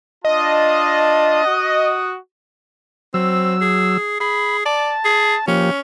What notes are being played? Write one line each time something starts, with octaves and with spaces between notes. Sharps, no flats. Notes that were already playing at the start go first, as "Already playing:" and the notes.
D4 F4 D#5 A5
F#4 F#5 D#6
F#3 C4 E6
G#4
G#4 B5
D5 A5
G#4
F3 A#3 C#4 G4